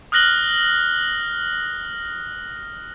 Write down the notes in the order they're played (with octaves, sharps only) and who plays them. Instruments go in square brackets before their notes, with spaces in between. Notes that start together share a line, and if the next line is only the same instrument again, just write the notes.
[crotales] D#6 F6 F#6 A#6 F#7 G7